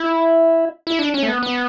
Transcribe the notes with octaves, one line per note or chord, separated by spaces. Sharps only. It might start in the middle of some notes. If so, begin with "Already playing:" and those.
Already playing: E4
E4
D4
C#4
A3
B3
B3